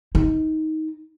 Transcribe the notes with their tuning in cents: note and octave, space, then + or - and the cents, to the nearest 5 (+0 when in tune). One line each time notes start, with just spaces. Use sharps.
D#4 +15